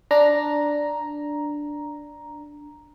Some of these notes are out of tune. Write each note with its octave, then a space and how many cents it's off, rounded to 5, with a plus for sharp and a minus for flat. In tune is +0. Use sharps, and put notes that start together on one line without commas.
D4 +0 A#5 +5